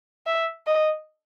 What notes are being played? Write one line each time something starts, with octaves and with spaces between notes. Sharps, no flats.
E5
D#5